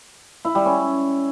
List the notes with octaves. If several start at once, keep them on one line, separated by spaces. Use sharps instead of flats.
E4
G3
C#4